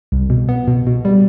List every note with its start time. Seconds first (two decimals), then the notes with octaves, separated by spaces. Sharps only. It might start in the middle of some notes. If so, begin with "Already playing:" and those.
0.12 C2
0.30 B2
0.49 B3
0.67 B2
0.87 B2
1.05 G3